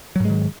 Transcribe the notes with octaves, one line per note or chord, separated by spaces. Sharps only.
G#2 D#3 F#3 G#3